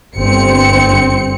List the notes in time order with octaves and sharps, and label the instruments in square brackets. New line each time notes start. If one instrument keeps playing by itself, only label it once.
[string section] G1 C4 C#7